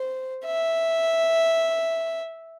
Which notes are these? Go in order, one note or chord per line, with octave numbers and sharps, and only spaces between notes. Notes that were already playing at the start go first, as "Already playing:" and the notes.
Already playing: C5
E5